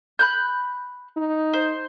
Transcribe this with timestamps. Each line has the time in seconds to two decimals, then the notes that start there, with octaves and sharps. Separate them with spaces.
0.19 B5 F#6 G6
1.17 D#4
1.53 C5